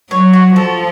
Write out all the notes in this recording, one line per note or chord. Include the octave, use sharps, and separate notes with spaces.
F#3 C#5
F#4
F3 A4